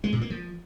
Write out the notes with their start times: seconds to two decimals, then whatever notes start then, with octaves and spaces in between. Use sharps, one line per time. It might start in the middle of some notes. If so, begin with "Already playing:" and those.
0.04 G#3
0.13 A#2
0.21 A#3
0.30 F3